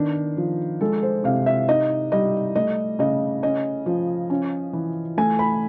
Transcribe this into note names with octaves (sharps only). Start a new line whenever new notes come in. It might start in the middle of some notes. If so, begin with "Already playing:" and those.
Already playing: D#3 B3 D4
F3
G#3 A4
C5
C3 F5
E5
D#4 D#5
G3 D#5
A3 D#5
C#3 D#5
C#4 D#5
F3
C#4
E3
A3 G#5
B5